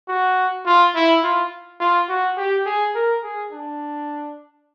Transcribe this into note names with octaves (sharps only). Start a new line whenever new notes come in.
F#4
F4
E4
F4
F4
F#4
G4
G#4
A#4
G#4
D4